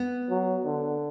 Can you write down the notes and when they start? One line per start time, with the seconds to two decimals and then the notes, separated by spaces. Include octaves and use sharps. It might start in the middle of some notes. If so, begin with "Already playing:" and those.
Already playing: B3
0.30 F#3
0.65 D3